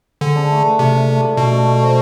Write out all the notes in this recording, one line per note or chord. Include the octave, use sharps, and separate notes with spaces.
D3 G#4
D4
A3
B4
C3 F4
D4
A3
A3
B2 A4
D4
A3
C5